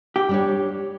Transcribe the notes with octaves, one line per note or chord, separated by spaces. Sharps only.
G4
G3 D4 C#5